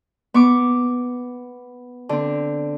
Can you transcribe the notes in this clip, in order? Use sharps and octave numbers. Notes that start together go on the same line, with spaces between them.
B3 C#6 D6
D3 C4